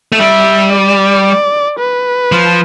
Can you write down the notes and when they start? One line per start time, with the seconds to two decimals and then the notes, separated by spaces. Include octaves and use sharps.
0.12 A3
0.19 G3 E5
0.73 D5
1.79 B4
2.32 F3